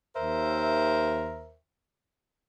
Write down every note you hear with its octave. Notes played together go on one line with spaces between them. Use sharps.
D#2 A#4 C5 E5